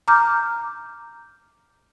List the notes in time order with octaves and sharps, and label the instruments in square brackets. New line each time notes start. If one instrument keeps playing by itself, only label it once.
[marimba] A#5 D6 F6 G6